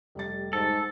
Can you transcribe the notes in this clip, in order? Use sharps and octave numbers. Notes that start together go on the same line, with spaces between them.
F1 G3 A6
G#2 A4